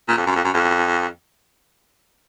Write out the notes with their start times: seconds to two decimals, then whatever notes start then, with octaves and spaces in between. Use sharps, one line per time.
0.08 A#2
0.17 F2
0.26 F#2
0.35 F2
0.44 F#2
0.54 F2